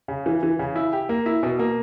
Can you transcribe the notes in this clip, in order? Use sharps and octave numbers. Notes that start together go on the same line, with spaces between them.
C#3
E3
E3
C#3
E4
G4
A#3
E4
B2
A#3